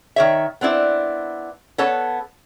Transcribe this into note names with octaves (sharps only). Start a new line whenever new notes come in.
D#3 C#5 E5
B3 C4 D4 E4
B3 A4 C#5 A5